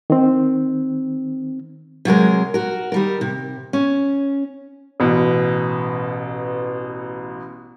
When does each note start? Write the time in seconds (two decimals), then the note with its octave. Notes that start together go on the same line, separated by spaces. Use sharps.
0.10 D#3 C4
2.05 C3 F#3 G#3 A#4
2.54 F#4 A#4
2.92 D#3 G3 A#4
3.21 C3
3.73 C#4
5.00 A1 B2